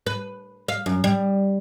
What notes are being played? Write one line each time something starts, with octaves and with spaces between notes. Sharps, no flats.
B4
F5
F#2
G3